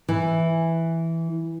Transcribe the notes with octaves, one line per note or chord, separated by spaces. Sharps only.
E3